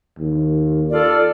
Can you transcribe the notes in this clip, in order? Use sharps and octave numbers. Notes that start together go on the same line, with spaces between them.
D#2
F4 A4 D5